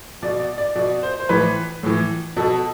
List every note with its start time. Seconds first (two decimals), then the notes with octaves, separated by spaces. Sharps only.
0.22 B2 D5
0.40 D5
0.58 D5
0.75 B2 D5
1.03 C5
1.19 C5
1.29 A2 E3 B4
1.83 A2 E3
2.37 B2 A4